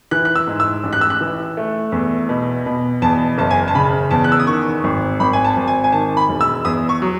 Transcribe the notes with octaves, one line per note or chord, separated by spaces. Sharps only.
E3 F#6
F#6
E6
G#2
E6
A1
F#6
E6
F#6
E3
A3
E2
B2
B2
E2 A5
F#1 A5
G#5
A5
C#3 B5
E2 A5
F#6
E6
D#6
D#3 C#6
G#1
G#1 B5
G#5
A5
G#1
G#5
G#5
D#3 A5
B5
E1
E6
E2 D#6
C#6
F#3